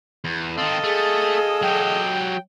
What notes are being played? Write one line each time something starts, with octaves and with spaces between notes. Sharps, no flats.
E2
D#3 C4 A4 D#5 F5 A6
A3 G#4
F#3 G4 G5